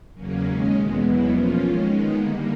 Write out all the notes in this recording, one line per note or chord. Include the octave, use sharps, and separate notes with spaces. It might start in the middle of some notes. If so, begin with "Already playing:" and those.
E2 C#3 F#3 A#3 C#4
D#2 D#3 G#3 C#4
E2 B2 G#3
E2 B2 F#3 B3 E4
F3 A#3 C#4 F4
D#3 G#3 C#4
D#3 G#3 B3 D#4
D3 G3 A#3